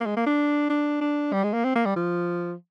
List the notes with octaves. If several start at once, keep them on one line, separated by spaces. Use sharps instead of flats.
A#3
G#3
A#3
D4
D4
D4
G3
G#3
A#3
C4
A#3
G3
F3